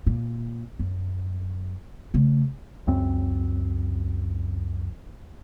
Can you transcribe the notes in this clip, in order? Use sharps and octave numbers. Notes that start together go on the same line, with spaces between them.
A#2
F#2
C#3 A3
C#2 F#2 C4